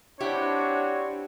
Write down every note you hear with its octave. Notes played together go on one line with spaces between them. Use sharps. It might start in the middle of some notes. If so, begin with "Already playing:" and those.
C4 D4 E4 F#4 G4 C#5